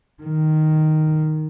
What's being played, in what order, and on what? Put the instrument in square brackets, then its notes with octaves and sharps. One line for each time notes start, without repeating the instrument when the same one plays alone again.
[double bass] D#3